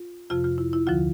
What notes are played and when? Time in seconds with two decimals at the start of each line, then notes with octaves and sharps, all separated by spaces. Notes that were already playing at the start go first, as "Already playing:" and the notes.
Already playing: F4
0.30 F2 C3 F3 F4
0.44 F4
0.58 E4
0.73 E4
0.87 D2 D3 F3 F4